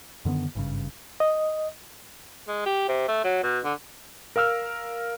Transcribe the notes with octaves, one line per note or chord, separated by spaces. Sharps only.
F#2 D3 D#3 B3
G#1 G2 C#3
D#5
G#3
G4
C3
A3
F#3
B2
D3
A#4 F5 E6 F6